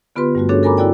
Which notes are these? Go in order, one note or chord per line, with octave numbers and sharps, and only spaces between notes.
D3 B3 F4 G4 B4 C6
G2 G3 A3 F#4
C#4 D4 F#4 G#4 A4 C#5
A4 A#4 G#5 A#5 B5 D6
E4 F#4 A4 D5 G5